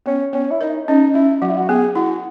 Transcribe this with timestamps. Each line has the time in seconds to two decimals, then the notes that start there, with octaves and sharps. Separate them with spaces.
0.06 B3 C#4
0.33 B3 C#4
0.51 E4
0.61 D#4 A#4
0.88 C#4 D#4
1.14 C#4 E4
1.42 F#3 F#4
1.50 E4
1.57 F#4
1.69 B3 G#4
1.95 E4 F#4